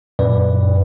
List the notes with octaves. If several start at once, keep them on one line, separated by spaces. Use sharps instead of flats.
F#2 A#2 B4 D5